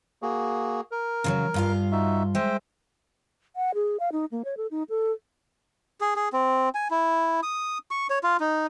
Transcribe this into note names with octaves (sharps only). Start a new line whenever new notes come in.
A#3 F#4 G#4
A#4
C#3 F3 F#3
G2 F4 F5
D#4 F#4 E5
G#3 C5 E5 G5
F#5
G#4
F5
D#4
A#3
C#5
A4
D#4
A4
G#4
G#4
C4
G#5
E4
D#6
C#6
C#5
F4
D#4